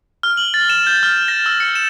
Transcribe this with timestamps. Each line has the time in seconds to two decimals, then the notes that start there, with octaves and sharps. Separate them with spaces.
0.23 F6
0.37 F#7
0.54 A6
0.70 E7
0.87 G6
1.03 F6
1.28 A#6
1.46 E6
1.60 C#7
1.75 E7